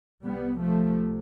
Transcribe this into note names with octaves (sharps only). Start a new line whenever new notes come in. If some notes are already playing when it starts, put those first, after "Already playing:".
C2 C3 G3 B3
F3 A3